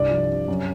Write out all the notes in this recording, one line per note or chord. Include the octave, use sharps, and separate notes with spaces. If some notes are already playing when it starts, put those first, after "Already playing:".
Already playing: C2 G2 D5
F3
C3
F#2